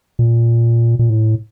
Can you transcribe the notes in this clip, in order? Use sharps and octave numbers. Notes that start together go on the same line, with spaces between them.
A#2
A#2
A2